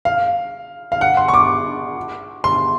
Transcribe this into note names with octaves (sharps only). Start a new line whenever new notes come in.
F5
F5
F#5
C6
C#6
D6
C6